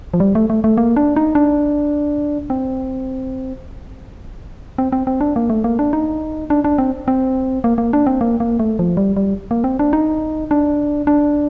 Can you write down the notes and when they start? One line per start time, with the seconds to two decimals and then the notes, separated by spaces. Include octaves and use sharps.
0.14 F3
0.20 G3
0.35 A3
0.50 A3
0.64 A3
0.78 A#3
0.96 D4
1.16 D#4
1.35 D4
2.50 C4
4.78 C4
4.92 C4
5.07 C4
5.21 D4
5.36 A#3
5.50 A3
5.64 A#3
5.79 D4
5.93 D#4
6.50 D4
6.64 D4
6.78 C4
7.08 C4
7.64 A#3
7.78 A#3
7.93 D4
8.07 C4
8.21 A#3
8.40 A#3
8.59 A3
8.79 F3
8.97 G3
9.17 G3
9.51 A#3
9.64 C4
9.79 D4
9.93 D#4
10.51 D4
11.07 D4